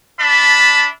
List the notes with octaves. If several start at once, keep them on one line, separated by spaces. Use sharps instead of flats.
D4 E5 A5 B5